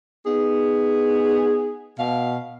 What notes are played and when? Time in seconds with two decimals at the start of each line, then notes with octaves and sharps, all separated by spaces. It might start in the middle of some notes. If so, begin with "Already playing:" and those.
0.24 B3 D#4 G#4
1.97 B2 F5